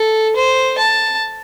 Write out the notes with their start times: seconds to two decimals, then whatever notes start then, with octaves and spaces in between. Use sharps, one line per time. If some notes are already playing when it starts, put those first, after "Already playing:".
Already playing: A4
0.36 C5
0.78 A5